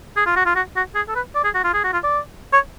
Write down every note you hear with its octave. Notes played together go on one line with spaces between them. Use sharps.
G#4
F4
F#4
F4
F#4
F#4
G#4
A4
B4
D5
G#4
F#4
F4
G#4
F#4
F4
D5
C#5